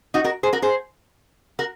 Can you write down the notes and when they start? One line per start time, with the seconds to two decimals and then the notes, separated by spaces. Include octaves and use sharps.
0.14 D#4 F#4
0.24 F#4 A#4
0.43 G#4 C5
0.53 F#4 A#4
0.62 G#4 C5
1.59 F#4 A#4